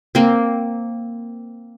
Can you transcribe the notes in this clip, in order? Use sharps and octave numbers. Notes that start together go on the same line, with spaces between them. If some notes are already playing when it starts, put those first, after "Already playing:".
A#3 C4